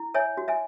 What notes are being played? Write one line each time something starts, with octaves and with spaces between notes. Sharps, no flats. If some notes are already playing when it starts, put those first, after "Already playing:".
Already playing: E4
C#5 E5 G#5
F#4
E5 G#5